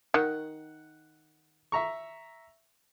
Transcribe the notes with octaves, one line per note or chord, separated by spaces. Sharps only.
D#3 F#5
E5 A#5 C#6